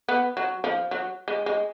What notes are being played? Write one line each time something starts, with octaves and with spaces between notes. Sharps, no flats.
B3
F#3
F3
F#3
G#3
G#3